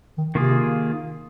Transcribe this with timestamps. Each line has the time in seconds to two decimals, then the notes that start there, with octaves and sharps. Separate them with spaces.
0.18 D#3
0.35 C3 D#3 A#3 F4 G#4